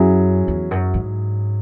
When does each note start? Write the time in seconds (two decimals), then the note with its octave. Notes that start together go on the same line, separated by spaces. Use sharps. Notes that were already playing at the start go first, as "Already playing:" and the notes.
Already playing: F#2 F#3 C#4 E4 G#4
0.48 E2
0.71 F#2
0.94 G#2